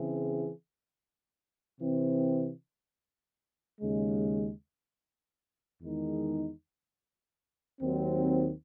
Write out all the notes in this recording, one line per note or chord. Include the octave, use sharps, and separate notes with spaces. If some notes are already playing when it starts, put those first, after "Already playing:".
Already playing: C#3 E3 C4 E4 G#4
C3 E3 C4
D#2 C#3 G#3
E2 D#3 G#3 D#4
D#2 D#3 F#3 C4